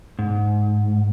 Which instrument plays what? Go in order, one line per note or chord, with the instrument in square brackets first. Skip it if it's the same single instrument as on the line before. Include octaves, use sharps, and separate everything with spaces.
[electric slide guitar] G#2